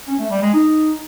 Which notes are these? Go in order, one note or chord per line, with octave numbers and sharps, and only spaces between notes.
C#4
A3
G3
G#3
D#4